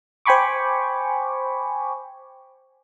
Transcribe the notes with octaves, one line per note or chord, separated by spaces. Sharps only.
C5 G5 G#5 B5 C#6 D6